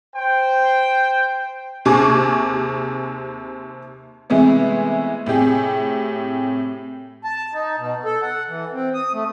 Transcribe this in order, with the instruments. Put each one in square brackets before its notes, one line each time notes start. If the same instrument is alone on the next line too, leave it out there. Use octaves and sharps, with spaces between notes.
[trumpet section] C5 G5
[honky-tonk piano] D#2 C3 G#4 C#6 D6
C3 E3 G#3 A3 B3
A2 C3 G4 G#4
[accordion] A5
D#4
B2
A4
F#5
E3
C4
D#6
A3